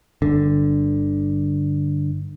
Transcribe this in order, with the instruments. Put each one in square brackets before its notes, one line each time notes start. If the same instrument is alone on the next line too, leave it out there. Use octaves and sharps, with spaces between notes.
[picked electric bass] G1 D3